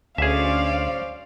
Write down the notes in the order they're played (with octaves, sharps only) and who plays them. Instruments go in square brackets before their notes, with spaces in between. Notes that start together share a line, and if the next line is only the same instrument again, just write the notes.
[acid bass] D2 [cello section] C#4 C5 D5 [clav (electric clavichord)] G#4 E5 [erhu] F5